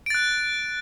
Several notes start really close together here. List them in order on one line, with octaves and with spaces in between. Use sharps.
D7 A6 F#6